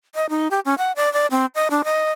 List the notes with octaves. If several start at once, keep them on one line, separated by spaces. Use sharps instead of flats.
D#5
D#4
G4
C#4
F#5
D5
D5
C4
D#5
D4
D#5